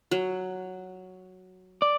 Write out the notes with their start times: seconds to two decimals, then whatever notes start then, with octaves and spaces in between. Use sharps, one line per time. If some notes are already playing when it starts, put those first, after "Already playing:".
0.11 F#3
1.82 D5